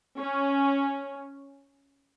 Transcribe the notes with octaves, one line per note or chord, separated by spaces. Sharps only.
C#4